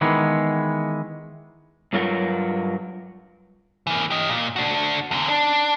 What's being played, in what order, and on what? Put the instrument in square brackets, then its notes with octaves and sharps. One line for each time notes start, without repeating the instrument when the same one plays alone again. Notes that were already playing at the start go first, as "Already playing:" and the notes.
[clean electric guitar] D#3 E3 G#3 B3
[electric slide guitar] G2 F#3 F4 A#4 F#5
[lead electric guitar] E3 A#3
G4 D#5
A#2
D4 F#4
E2 D3
D4